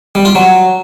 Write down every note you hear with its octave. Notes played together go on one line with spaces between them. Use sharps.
G3
F4
F#3